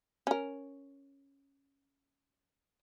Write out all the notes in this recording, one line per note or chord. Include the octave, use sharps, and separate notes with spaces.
C#4 A#4